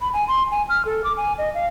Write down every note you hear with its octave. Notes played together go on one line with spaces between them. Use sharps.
B5
G#5
C6
G#5
F6
A4
D6
G#5
D#5
F5